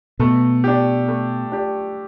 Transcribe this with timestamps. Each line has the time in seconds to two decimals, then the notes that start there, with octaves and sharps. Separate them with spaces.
0.19 B2 A3
0.64 D4 G4
1.08 A3
1.52 D4 G4